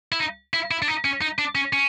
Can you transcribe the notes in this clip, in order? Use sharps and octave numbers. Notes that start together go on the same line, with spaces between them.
E4
D#4
E4
E4
D4
D#4
C#4
D#4
D4
C#4
C#4